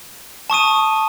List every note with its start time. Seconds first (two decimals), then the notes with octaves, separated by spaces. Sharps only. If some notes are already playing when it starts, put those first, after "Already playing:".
0.50 A5 C#6 D#6 D#7